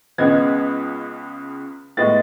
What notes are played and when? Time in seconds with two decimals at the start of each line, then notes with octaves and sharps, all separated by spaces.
0.18 C#2 C#3 G#3 B3 G#6
1.97 A2 G#3 B3 A6